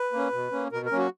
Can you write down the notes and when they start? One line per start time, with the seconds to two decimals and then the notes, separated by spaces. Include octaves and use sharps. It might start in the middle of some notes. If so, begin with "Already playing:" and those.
Already playing: B4
0.13 A#3 C#4
0.32 B2
0.52 A#3 C#4
0.72 B2 A#4
0.86 A#4
0.92 F#3 A#3 C#4
0.98 F#4